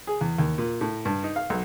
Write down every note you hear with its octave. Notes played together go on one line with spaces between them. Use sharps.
G#4
E2
D#2
A#2
A2
G2
D#4
F5
B1